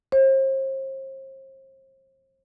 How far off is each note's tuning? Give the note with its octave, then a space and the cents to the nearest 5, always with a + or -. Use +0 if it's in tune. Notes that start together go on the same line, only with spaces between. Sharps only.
C5 +40